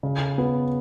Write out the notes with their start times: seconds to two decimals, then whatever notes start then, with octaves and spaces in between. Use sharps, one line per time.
0.03 C#3
0.38 B3